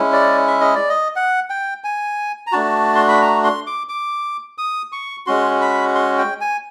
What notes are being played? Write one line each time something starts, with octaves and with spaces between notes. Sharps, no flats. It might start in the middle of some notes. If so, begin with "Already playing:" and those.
Already playing: G#3 C#4 E4
D5
E5
D#5
D5
D#5
F#5
G5
G#5
A#5
A3 D4 F#4 A5
C6
B5
A#5
C6
D6
D6
D#6
C#6
G#3 C#4 F#4 C6
B5
C6
G5
G#5